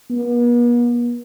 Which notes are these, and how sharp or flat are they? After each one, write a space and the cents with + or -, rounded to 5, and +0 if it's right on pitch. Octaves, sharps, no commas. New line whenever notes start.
B3 -45